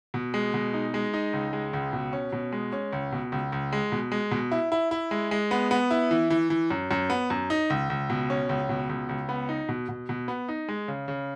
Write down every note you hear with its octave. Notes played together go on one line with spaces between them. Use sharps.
B2
G#3
B2
D#4
G#3
D#4
C#2
G#3
C#2
B2
C#4
B2
G#3
C#4
C#2
B2
C#2
C#2
G#3
B2
G#3
B2
E4
E4
E4
G#3
G#3
B3
B3
E4
E3
E3
E3
F#2
F#2
B3
F#2
D#4
C#2
C#2
B2
C#4
C#2
B2
C#2
C#2
B3
D#4
B2
B2
B2
B3
D#4
G#3
C#3
C#3